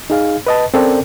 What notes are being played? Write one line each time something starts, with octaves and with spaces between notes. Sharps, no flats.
D#4 G#4 F5
B4 D#5 A5
C4 C#4 A4 A#4 D5 G5